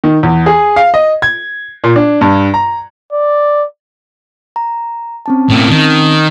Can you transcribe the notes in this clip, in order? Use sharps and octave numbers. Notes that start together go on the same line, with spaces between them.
D#3
E2
G#4
F5
D#5
G#6
A#2
D4
G2
A#5
D5
A#5
C4 C#4 A5
A2 A#3
D#3